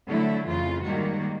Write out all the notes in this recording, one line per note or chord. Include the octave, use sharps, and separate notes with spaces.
D3 F#3 A3 E4
F2 C#3 E3 F4
G#2 D#3 G3 A#3 F#4